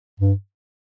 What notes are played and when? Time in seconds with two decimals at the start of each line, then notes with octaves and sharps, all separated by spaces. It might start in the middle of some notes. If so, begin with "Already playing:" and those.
0.20 G2